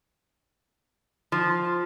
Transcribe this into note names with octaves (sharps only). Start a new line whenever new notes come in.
F3